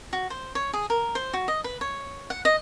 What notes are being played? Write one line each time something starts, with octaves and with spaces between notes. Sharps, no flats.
F#4
C5
C#5
G#4
A#4
C5
F#4
D#5
B4
C#5
F#5
D#5